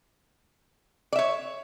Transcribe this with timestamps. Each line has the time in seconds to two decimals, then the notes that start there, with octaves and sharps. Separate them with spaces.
1.13 D5
1.16 E5
1.19 C#5